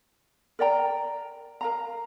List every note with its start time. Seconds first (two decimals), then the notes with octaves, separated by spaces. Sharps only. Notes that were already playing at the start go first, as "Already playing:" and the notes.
0.59 A#4 D5 G5 A#5
1.61 A#4 F5 A#5